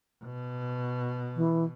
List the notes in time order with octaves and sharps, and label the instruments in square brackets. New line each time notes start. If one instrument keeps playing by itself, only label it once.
[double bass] B2
[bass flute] E3